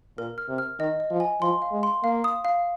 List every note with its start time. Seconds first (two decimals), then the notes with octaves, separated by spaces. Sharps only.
0.18 A#2 A#4
0.38 F6
0.49 C3
0.58 F6
0.79 D#3 D#5
1.00 D#5
1.11 F3
1.20 G#5
1.41 F3 C6
1.62 F5
1.72 G#3
1.83 C6
2.03 A#3 F5
2.24 D#6
2.45 F5